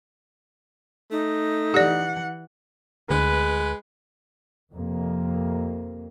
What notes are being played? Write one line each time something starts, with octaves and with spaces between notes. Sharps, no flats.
A3 D#4
E3 G4 D5 F#5
D2 G#3 B4
F2 C3 A#3